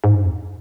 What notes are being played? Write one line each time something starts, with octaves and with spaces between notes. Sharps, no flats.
G#2
G2
F2